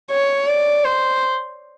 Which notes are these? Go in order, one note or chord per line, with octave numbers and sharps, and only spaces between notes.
C#5
D5
C5